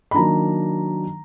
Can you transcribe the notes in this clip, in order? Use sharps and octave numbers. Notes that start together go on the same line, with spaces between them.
B5
D#3 F#3 A#3 D4 A#5